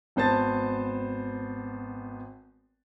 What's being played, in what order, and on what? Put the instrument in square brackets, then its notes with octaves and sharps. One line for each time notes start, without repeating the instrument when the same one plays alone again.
[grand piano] G#1 B3 C5 A5 A6